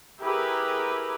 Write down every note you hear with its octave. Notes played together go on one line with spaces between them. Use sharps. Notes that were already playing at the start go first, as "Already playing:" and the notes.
E4 G4 G#4 A#4 B4